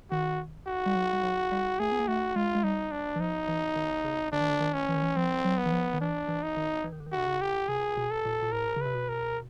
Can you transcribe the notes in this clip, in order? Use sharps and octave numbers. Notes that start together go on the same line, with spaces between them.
D#3 F#4
F#4
G3
F#3
G3
F#3
G3
A3 G#4
B3
A#3
A3 F#4
G#3 F4
G#3
G3 D#4
D4
E3
F3 D#4
E3
D#3
C#3
D3 D4
D#3
D3
D#3
C#4
E3
D#3
E3
F3 C4
F#3
B3
E3
F3
D#3
E3 D4
E3
D#4
D#3
E3
D#3
D3
D#3
C3 F#4
C#3
G4
C3 G#4
B2
A4
A#2
A#2
A2 A#4
C#3
C3 B4
B2
A#4